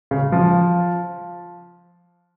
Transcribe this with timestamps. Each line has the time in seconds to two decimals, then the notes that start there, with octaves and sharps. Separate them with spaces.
0.11 C#3
0.32 F3